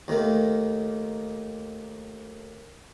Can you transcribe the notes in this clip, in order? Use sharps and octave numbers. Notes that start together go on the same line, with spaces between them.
D#2 D#3 A3 A#3